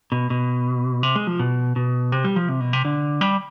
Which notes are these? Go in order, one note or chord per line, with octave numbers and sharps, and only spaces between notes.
B2
B2
C3
G#3
F3
B2
B2
C3
G3
F3
C3
B2
C3
D3
G3